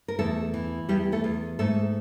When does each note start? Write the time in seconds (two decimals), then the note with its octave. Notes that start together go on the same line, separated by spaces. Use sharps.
0.08 A#4
0.19 E2 A3 A4
0.54 E3
0.89 E2 G3 G4
1.12 A3 A4
1.24 E2
1.59 G#2 A3 A4